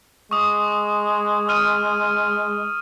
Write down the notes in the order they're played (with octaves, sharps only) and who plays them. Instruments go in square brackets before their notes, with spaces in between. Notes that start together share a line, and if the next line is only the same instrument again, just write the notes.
[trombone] G#3 [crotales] C#6 D#6
[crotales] D#6 F6 D#7